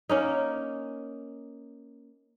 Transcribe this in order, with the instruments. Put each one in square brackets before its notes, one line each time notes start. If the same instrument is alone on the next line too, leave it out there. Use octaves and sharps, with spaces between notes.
[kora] A#3 C#4 D#4